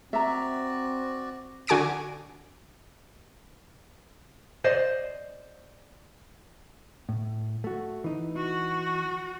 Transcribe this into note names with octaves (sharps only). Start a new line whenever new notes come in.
C4 F#4 D5 E5 A#5
D3 F#4 G#5 D6 A#6 D7
C5 D5 D#5
A2
A3 F#4
E3 D#4
F#4